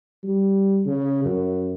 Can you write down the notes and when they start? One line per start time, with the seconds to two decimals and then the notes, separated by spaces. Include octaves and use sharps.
0.24 G3
0.85 C#3
1.24 F#2